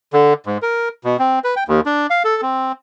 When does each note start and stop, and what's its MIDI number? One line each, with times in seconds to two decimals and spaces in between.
0.13 0.33 50
0.46 0.58 44
0.62 0.89 70
1.04 1.17 47
1.19 1.39 60
1.44 1.55 71
1.56 1.64 79
1.68 1.80 39
1.86 2.07 62
2.10 2.23 77
2.25 2.41 69
2.42 2.72 60